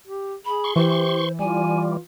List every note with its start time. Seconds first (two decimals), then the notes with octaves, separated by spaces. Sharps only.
0.07 G4
0.45 G#4 B5
0.64 C6 C#6
0.76 E3 G4 C5
1.39 G3 F4 G#5